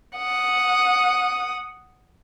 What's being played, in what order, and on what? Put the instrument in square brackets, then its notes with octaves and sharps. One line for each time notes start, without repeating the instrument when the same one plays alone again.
[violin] F#5 D#6